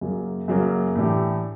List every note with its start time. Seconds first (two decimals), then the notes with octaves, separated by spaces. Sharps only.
0.01 F#2 C#3 F#3 A#3
0.48 F#2 C#3 F#3 A#3
0.96 A2 E3 A3 D4 G4